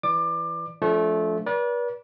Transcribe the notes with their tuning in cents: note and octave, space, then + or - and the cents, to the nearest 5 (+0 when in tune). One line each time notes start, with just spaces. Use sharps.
E3 +10 D5 +0 D6 +25
F3 +0 A3 -20 D4 -35
B4 -40 D5 -30